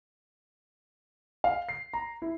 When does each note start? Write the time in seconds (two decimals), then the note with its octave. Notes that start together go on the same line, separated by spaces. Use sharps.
1.44 F5
1.69 C7
1.93 A#5
2.22 E4